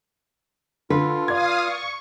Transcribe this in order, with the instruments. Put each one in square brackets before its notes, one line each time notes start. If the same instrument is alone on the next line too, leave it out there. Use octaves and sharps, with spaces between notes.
[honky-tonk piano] D3 [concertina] F4 [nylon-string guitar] B4
[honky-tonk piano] D5 G#6 [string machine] F5 D#6 F6
[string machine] C#6